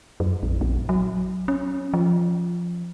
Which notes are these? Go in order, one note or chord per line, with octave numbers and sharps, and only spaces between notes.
F#2
A#1
A#1
F#3
C#4
F3